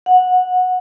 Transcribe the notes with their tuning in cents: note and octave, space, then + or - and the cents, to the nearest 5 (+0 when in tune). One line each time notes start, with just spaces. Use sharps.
F#5 -15